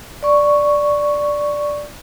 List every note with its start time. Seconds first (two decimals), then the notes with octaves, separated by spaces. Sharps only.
0.23 D5 C#6